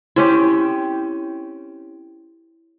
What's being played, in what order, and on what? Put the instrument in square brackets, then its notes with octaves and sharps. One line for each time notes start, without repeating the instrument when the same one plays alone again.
[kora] C4 C#4 G4 [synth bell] E4